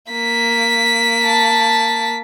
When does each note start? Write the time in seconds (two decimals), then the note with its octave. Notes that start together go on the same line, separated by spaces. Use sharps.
0.12 A#3 B6
1.24 A5